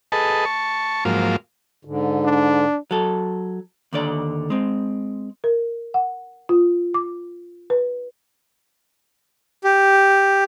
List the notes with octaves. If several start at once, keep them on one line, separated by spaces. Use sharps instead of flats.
G#4 A4 B4 D#5 A5
A5 C#6
G#2 F3 F#3 A#3 F5
G#2 D3
D4
F#3 A4
D#2 D3 D5
G#3 C4
A#4
F#5
F4
D6
B4
G4